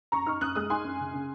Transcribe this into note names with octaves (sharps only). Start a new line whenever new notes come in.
F#2 A#5 C#6
D#4 C#6 F6
F#2 D#6 F#6
G#3 D#6 F#6
D#4 G#5 C6
F#2
C#3
C#3